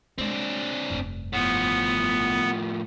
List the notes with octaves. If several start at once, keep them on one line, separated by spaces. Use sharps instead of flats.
G#3 C4 D4
F1 G2
A2 F3 B3